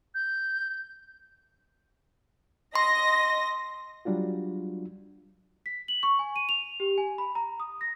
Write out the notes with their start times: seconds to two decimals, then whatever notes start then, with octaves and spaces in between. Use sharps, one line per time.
0.14 G6
2.76 D#5 C6 A#6
4.05 F#3 G3 D4 F4 F#4
5.66 B6
5.88 F#7
6.03 C#6
6.19 G#5
6.36 D#7
6.49 F7
6.80 G4
6.98 G#5
7.18 B5
7.35 A#5
7.60 D#6
7.81 A#6